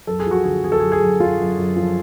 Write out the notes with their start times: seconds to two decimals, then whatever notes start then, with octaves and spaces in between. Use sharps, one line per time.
0.07 F#2 A4
0.20 G#4
0.26 F3 F#4
0.44 D3 G#4
0.64 D3 G#4
0.72 A4
0.79 G#4
0.82 F#2
0.92 G#4
1.01 F#2
1.20 F#2 F4
1.39 F#2
1.57 F#2
1.76 F3